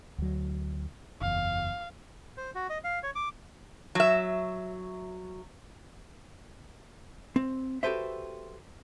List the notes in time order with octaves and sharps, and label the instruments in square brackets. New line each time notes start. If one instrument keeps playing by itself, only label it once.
[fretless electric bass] D2 F#3
[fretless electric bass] F#1 E2 [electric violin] F5
[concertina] C5
F#4
D#5
F5
C#5
D6
[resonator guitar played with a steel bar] F#3 E5
[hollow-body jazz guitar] C4
F#4 G4 A4 B4 C5 E5